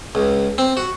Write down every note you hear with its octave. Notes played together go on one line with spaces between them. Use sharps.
C#2
C4
F#4